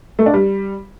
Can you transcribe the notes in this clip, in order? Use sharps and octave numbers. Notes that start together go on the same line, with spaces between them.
A3
D4
G3